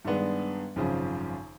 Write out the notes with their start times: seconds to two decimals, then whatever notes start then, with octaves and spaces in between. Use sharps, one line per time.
0.05 G2 D#3 G#3 B3 D4
0.76 G#1 F#2 C#3 F3